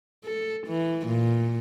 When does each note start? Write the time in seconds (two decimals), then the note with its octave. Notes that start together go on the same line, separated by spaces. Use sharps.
0.24 A4
0.67 E3
1.07 A#2